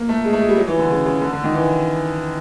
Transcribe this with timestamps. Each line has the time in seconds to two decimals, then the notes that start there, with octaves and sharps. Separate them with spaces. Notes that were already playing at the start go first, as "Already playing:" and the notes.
Already playing: A#3
0.09 A3
0.24 G#3
0.33 A3
0.41 G#3
0.49 G3
0.57 F#3
0.67 E3
0.79 D3
0.89 C#3
1.06 C#3
1.21 D3
1.33 D3
1.44 D#3
1.54 E3